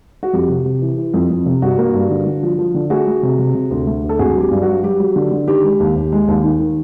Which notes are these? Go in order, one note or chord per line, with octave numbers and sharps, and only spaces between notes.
F#4
F2 G4
C3
C3
E3
E3
F2
F2
C3
G2 F#4
A#3
G2
D3
D3
F3
F3
D3
A3 F#4 G#4
A3
C3
C3
C3
D2
A3
D2
A4
G#1 F#4 G#4
F#3
G4
G2
F#4
F#3
F#3 G4
F#3
D3
D3
D#3 G4
G#3
D#2
D#2
G#3
D#2
D#3
D#3